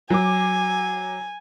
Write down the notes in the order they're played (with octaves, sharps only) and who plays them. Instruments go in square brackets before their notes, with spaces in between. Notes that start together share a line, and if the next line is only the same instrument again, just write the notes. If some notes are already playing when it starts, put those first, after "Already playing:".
[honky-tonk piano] F#3 D6 [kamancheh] G#5